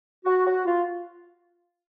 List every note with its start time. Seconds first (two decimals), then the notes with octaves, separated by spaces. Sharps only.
0.25 F#4
0.46 F#4
0.65 F4